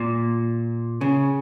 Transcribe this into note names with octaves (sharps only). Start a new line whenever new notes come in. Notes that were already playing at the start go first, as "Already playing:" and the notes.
Already playing: A#2
C#3